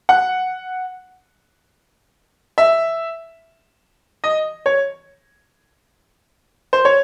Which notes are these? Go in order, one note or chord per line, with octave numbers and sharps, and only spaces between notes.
F#5
E5
D#5
C#5
C5
C#5